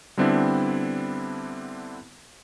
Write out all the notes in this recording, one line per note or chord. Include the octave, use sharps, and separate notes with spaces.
D3 G3 B3 C4 D4 E4